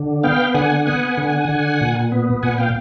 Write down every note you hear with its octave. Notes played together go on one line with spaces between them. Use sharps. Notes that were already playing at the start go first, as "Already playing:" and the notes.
Already playing: D3
B3 F5 G5
D3 F#5 G#5
B3 F#5 G#5
D3
D3
A#2
B3
A#2 F#5 G#5
F5 G5